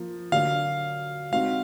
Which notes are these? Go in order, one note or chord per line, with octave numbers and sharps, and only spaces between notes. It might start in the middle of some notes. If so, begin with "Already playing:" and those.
Already playing: F3 A#3
D3 F#3 A#3 D4 F5
G#3 C4 D#4 F#4 F5